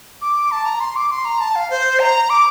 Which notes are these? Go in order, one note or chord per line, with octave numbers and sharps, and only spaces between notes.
D6
A5
A#5
C6
D6
C6
A#5
A5
F5
C5
A#5
D6